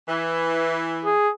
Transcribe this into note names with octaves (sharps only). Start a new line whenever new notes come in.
E3
G#4